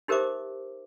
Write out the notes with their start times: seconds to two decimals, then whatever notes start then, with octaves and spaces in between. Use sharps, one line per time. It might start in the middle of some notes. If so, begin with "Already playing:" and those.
0.08 D#4 G4 A#4 C5 E5 D6